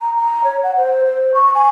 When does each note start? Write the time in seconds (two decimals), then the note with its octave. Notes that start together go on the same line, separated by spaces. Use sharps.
0.01 A#5
0.17 A#5
0.44 C#5
0.63 F#5
0.77 C5
1.05 C5
1.34 C#6
1.55 G#5